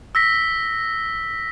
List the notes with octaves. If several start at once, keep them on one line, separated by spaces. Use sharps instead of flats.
E6 A#6 B6